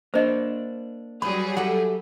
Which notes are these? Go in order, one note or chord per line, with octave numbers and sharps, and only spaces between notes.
A#3 D4 C5 D#5
F#3 G3 G#4 B4 D5 B5
G4 A4 E5 F#5